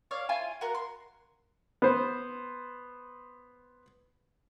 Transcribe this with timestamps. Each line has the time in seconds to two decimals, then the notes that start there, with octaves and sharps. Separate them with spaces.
0.11 C#5 D5 F5
0.29 E4 F4 G#5
0.61 F#4 A#4 F#5
0.75 C6
1.82 B3 C5